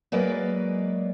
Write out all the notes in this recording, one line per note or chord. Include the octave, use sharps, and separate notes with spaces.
F#3 G#3 A#3 B4 D5